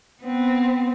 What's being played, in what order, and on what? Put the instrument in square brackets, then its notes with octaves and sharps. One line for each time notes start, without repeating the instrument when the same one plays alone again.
[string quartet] B3 C4